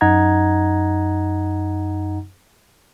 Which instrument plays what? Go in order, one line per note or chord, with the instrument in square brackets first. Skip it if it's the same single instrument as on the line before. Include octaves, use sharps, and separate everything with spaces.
[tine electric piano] F#2 D#4 D#5 F#5 A#5 G#6